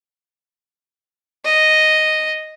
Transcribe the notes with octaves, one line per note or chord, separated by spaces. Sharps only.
D#5